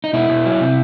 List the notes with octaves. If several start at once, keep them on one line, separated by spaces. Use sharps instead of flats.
D#4
B2 E4
B2
F#3
C3